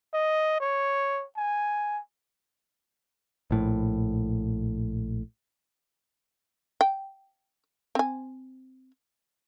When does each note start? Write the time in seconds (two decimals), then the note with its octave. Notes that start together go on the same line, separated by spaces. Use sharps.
0.13 D#5
0.60 C#5
1.37 G#5
3.51 A#1 A2
6.81 G5
7.95 C4 G#5